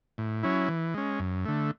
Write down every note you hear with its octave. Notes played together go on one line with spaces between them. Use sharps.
A2
F#3 C#4 E4
E3
G#3 C#4
F#2
D3 A3